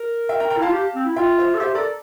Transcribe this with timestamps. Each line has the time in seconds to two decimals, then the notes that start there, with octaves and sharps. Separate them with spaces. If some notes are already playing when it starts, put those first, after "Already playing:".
Already playing: A#4
0.29 E5 G5
0.40 G5 A#5
0.50 G5 A#5
0.57 E4
0.62 F4 F5 A5
0.73 G4
0.95 C4
1.05 E4
1.16 F4 E5 G5
1.38 C5 E5
1.54 A4
1.60 G4 C5 E5
1.75 A4 A#4 D5